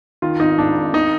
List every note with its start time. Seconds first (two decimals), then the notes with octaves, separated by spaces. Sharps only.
0.22 D#3 F4
0.40 G#1 D#4
0.58 G#2 D4
0.76 G#1
0.93 D#3 D#4